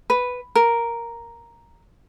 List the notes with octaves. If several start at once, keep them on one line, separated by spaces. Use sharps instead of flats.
B4
A#4